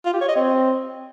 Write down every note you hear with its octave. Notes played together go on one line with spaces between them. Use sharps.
F4
G4
C#5
D#5
C4